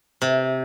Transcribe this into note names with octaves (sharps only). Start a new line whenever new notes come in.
C3